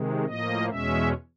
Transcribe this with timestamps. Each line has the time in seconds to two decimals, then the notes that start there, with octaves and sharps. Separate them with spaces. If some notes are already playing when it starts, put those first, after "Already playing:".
Already playing: C3 D#3 G#3
0.25 A2 F3 A#3 D#5
0.69 E2 B2 G#3 C#4 E5